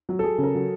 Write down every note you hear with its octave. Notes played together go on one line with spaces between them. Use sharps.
F#3
A4
F#3 G#4
C#3
A#4
F#3